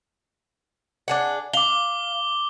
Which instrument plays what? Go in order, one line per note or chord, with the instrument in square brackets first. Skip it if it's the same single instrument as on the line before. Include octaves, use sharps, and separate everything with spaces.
[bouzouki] D4 G#4 F#5
[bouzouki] F5 [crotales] D6 G7